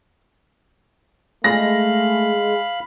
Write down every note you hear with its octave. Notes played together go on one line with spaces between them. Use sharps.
G#3 A3 F5 B5 A#6